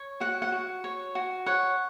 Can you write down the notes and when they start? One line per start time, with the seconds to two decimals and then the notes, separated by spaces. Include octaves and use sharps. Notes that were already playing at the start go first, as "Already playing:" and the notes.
Already playing: C#5
0.20 F#4 F#5
0.42 F#5
0.52 F#4
0.84 C#5
1.15 F#4
1.46 C#5 F#5